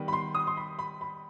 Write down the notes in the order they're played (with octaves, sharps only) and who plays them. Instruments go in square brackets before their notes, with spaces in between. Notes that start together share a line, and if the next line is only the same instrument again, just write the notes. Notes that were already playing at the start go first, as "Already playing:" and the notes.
Already playing: [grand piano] D#3 G3 B3
[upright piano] B5
C6
D#6
C6
B5
B5
B5